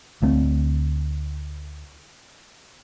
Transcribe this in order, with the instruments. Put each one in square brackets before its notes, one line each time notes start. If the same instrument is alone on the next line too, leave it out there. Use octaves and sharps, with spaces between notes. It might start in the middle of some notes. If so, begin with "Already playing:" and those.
[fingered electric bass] D2 A3 C4